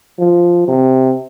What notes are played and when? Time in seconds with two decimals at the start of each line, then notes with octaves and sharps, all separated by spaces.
0.19 F3
0.68 C3